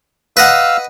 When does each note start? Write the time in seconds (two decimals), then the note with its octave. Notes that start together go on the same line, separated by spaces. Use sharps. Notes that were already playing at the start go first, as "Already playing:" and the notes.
0.37 B4 D#5 F5 F#5 E6